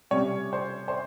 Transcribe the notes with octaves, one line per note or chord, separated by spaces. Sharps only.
C3 G3 C#4 C#5
C5
C5